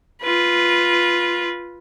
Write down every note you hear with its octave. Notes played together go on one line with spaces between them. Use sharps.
F4 B4